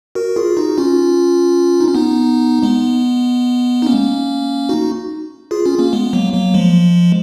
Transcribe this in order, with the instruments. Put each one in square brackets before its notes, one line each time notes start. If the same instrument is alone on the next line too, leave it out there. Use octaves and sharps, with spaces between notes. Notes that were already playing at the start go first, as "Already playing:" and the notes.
[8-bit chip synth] F#4 A#4
F4 G#4
D#4 F#4
C#4 F4
D#4
C#4
B3 D#4
G#3 B3
D#4
A#3 C#4
D#4 F#4
F4 G#4
C#4 F4
A#3 C#4
G#3 B3
F#3 A#3
F#3 A#3
F3 G#3